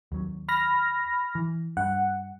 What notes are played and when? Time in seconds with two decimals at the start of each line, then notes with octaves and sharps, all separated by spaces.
0.12 D#2 F#3
0.49 B5 F6 A#6
1.35 E3
1.77 G2 F#5